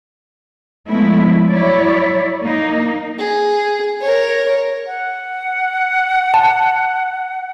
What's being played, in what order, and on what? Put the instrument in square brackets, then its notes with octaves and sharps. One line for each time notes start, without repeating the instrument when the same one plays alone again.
[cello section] F3 G#3 A3 B3 E4
F#3 E4 C#5 D5
A#3 D#4
[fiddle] G#4
A#4 C#5
[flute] F#5
[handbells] A5